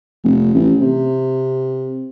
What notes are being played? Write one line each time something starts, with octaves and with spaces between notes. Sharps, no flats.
F1
A1
C3